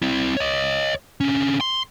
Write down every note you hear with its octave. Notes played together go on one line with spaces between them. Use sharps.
C4 E4
C#5 D#5
D3 C#4
C6